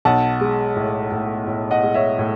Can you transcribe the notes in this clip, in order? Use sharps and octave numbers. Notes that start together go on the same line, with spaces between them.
B1 F#5 A5
G#3
A2
A2
A2
D#5 F#5
G#3
C#5 E5
A2